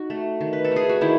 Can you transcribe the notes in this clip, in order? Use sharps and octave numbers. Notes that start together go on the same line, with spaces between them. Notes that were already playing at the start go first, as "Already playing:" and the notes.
Already playing: D#4 F#4
A3
D#3
B4
A4
A3 G#4
F#4
D#3 E4